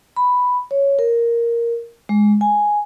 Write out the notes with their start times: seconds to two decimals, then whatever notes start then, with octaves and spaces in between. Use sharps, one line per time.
0.16 B5
0.71 C#5
0.99 A#4
2.09 G#3
2.41 G#5